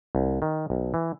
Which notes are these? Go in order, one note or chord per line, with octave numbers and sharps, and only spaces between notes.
C2
D#3
B1
E3